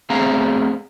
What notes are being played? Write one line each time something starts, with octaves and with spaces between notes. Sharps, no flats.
A3 B3 C4 G#4 F5 A#5